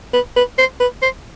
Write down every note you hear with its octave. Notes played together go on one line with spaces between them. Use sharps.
B4
B4
C5
B4
C5